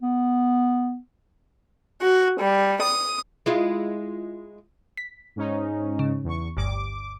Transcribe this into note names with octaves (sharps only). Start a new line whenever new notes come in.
B3
F#4
G3
D#6
G#3 E4 F4
B6
G#2 C#4 D#4
C#3
E2 C#6
G1 D2 G2 D6